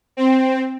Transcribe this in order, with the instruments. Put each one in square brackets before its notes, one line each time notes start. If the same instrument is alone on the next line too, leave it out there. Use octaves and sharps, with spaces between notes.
[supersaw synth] C4